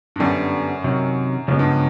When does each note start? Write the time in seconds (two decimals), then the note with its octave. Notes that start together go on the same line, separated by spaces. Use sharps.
0.16 G2
0.20 F#2 D3 G3 B3
0.84 C3 D#3 F#3
1.48 F#2 C#3 F3 G#3 B3
1.59 G2